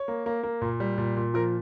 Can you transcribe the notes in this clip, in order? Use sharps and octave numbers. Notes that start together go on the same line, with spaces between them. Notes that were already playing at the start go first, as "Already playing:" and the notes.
Already playing: C#5
A#3
A#3
A#3
A#2
G3
A#2
A#2
F3 A#4